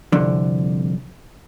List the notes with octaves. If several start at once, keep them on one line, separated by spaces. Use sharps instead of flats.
C2 F2 D3